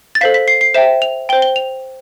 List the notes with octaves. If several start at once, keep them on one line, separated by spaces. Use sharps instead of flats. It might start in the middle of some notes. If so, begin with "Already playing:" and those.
A6
A4 C5 F5 B6
B6
C7
C7
C5 E5 G5 E7
F7
C5 G5 G7
G7
F7